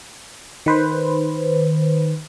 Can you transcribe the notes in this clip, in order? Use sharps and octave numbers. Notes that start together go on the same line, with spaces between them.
D#3 B4 C5